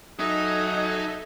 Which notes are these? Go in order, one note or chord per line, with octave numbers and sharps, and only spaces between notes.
F#3 D#4 G#4 A4 D#5 E5